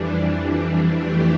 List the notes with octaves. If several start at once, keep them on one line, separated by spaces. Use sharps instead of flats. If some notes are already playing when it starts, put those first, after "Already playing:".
Already playing: F2 E3 G3 D4
F2 E3 A3 D4 G4